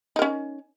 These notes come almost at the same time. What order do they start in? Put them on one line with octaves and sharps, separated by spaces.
D#4 A#4 C#4